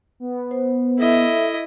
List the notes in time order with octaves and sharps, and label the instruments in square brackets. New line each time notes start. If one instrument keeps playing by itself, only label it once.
[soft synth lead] B3
[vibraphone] C5
[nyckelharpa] E4 D#5 [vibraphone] A4 E5